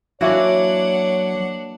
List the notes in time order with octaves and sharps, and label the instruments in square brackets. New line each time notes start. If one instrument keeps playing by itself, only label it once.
[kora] E3 A#3 F#4 [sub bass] F#3 [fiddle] D4 F#5 [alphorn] C#5